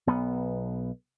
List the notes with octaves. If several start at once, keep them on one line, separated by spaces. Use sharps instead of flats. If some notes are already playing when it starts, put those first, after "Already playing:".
B1 B3